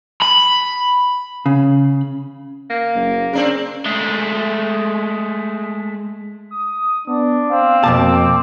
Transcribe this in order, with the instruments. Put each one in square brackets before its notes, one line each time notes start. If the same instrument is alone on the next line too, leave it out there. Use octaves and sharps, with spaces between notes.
[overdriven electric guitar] B5
[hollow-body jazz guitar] C#3
[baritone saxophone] A#3
[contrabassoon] F#1
[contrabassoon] C#3 [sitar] C4 D4 A#4
[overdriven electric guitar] G#3 A3
[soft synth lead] D#6
[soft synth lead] B3 [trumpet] D4
[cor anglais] C4 [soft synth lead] F5
[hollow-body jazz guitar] F2 B2 A5 [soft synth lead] A#3 [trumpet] D6